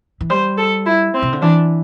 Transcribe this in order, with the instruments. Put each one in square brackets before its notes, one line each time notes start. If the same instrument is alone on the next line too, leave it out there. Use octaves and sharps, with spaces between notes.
[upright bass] E3
[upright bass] G3 [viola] C5
[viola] A4
E4
C4
[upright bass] C3
D3
[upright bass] E3 [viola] D4